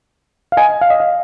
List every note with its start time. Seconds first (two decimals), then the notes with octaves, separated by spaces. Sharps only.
0.52 F5
0.57 D#5 G#5
0.81 F5
0.90 D#5
1.00 F5